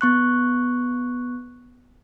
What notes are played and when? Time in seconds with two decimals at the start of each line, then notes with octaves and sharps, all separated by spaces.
0.01 B3 C#6 F#6